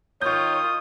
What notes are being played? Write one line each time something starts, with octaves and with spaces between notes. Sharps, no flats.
D#3 F4 A#4 C#5 C#6 D#6 G6